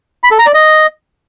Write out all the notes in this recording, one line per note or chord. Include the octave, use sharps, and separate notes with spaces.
B5
A4
A#5
D5
D#5